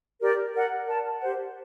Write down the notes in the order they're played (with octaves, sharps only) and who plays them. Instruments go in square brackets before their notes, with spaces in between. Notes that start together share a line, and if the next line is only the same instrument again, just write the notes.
[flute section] G4 A#4 D5
A#4 D5 F#5
A#4 D5 A5
G4 C5 F#5